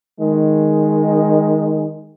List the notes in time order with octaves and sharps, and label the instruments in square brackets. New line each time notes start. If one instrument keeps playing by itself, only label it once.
[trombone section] D#3 G#3